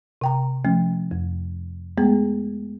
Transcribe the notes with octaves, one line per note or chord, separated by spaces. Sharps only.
C3 G5 A#5
F3 A3 C#4
F2
G#3 A3 B3 G#4